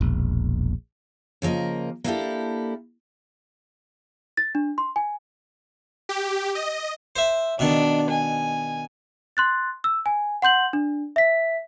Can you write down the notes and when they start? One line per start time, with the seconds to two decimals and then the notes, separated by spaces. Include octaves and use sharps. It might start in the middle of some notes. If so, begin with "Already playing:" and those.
0.01 E1 A#1
1.42 C#3 F3 A#3 A#4 D#5
2.04 A#3 D4 E4 F#4 G4 A4
4.37 A6
4.55 D4
4.78 C6
4.96 G#5
6.09 G4
6.55 D#5
7.16 C5 E5
7.59 B2 D#3 D4
8.10 G#5
9.37 C6 F#6 A6
9.84 E6
10.06 G#5
10.42 F#5 C6 G6 F#7
10.73 D4
11.16 E5 B6